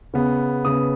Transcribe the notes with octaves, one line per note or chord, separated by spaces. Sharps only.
C#3 B3
C#3 B3 D#6